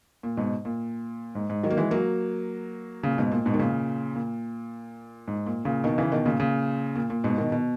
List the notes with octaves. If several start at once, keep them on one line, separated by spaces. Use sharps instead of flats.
A#2
G#2 B2
A#2
G#2
G#2
D#3 F#3
A#3
E3 G#3
F#3 A#3
A#2 C#3
G#2 B2
A#2
G#2 B2
D#3
A#2 C#3
A#2
G#2
A#2
A#2 C#3
B2 D#3
C#3 E3
B2 D#3
A#2 C#3
A#2 C#3
A#2
A#2
G#2 B2
B2 D#3
B2